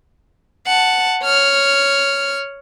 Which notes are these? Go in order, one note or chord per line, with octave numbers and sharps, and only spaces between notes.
F#5 A5
C#5 F6